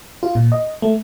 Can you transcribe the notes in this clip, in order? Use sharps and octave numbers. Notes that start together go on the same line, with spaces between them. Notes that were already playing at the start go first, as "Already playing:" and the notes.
F4
A#2
D#5
A3